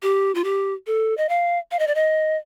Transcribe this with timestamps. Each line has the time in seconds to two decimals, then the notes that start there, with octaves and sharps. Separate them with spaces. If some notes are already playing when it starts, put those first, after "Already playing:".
0.02 G4
0.35 F4
0.44 G4
0.87 A4
1.17 D#5
1.29 F5
1.71 F5
1.79 D#5
1.87 D5
1.95 D#5